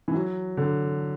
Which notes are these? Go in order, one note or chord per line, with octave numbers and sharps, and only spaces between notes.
E3
F#3
D3